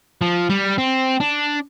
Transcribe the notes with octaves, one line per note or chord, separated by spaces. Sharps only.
F3
G3
C4
D4